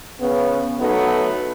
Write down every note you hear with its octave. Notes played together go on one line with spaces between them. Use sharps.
C#3 B3
F#3 A3 B3 D#4 A4